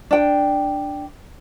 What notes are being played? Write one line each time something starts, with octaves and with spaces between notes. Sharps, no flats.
D4 G5